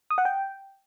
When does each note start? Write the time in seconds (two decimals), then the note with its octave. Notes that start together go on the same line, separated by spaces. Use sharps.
0.10 D#6
0.18 F#5
0.25 G5